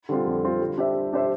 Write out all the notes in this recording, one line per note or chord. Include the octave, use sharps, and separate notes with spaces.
D3 G3 C4 F4
F2
D3 G3 C4 F4
G3
D4 G4 C5 E5
G3
D4 G4 C5 E5